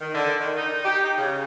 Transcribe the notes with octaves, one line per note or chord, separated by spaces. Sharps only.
D#3
D3
D#3
D#4
G4
D#4
C#3